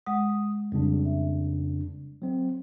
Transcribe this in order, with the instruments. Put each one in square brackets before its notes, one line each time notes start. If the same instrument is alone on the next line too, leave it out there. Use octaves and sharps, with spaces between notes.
[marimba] G#3 F#5 [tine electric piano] D#6
[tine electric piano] F2 C#3 D4 [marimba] G3
[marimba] E5
[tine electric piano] F#3 C4